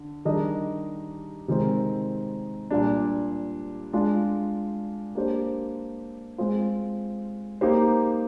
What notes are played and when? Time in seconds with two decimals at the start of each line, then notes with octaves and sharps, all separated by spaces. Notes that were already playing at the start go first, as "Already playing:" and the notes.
Already playing: D3
0.25 D#3 G3 D4 G#4 D#5
1.48 C3 D#3 G#3 C4
2.71 A#2 G3 D4
3.93 G#3 D4 F4
5.15 A#3 D4 G4 C5
6.38 G#3 C4 F4
7.61 A#3 D#4 G4 C5